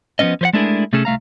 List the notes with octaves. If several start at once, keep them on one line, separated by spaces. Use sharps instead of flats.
F3 F#3 B3 C#4 D#5
F3 C5 F#5
G#3 A3 D4 E4 G#4 A#4
C3 A3 C#4 G#4 A4
C2 A3 F5 A#5